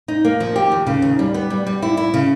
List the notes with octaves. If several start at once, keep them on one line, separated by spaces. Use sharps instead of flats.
D#4
A#3
F3
G4
D#2
C#3
D#2
G3
B3
G3
G3
E4
E4
C#3